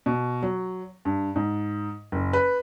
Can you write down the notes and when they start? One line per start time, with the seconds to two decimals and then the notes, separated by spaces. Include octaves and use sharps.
0.06 B2
0.43 F#3
1.05 G2
1.36 G#2
2.12 F#1
2.33 B4